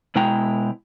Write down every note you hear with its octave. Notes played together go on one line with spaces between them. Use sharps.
B2 G#3 E4 G5 A#5